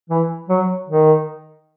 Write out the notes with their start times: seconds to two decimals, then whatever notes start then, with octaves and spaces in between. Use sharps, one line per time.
0.10 E3
0.49 F#3
0.88 D#3